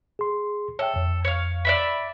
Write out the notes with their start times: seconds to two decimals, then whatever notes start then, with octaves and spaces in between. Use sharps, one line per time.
0.19 G#4 C6
0.79 A4 C#5 E5 G5
0.96 F2
1.25 C#5 F5
1.65 D5 E5 B5